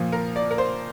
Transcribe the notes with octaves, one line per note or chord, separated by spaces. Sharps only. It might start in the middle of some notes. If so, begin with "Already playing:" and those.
Already playing: A#2 F3
A#4
D5
A#4
C5